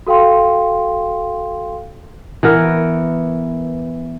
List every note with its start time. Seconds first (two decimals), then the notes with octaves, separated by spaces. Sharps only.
0.06 F#4 A4 F5 G5 C6
2.43 E3 B3 A#4